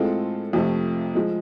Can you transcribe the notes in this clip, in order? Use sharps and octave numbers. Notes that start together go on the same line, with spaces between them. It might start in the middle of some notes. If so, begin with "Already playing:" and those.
Already playing: A2 G#3 C4 F4 A4
F2 C3 F3 A3
F3 G#3